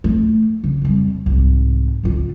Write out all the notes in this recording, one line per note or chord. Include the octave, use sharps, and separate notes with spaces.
A3
C#3
F2 G3
C2 G#2
C#2 F4